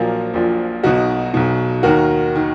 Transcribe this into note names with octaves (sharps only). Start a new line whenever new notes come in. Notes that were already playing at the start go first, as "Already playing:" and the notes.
Already playing: A#1 A#2 F3 F#3 A#3
A#1 A#2 F3
B1 B2 D#4 F#4
B1 B2
D#2 D#3 F#4 A#4
D#3